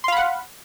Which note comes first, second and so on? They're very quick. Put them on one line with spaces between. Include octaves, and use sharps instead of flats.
C6 F5 B5 F#5